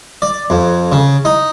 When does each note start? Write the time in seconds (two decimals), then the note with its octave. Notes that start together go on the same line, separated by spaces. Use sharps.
0.22 D5
0.50 F2
0.92 C#3
1.25 D#4